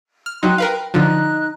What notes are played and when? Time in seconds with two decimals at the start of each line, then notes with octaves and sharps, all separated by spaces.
0.26 F6
0.43 F#3 D#4 G5 C6 F#6
0.58 A#4 B4 F5 G5
0.94 D3 F3 D#4 F#6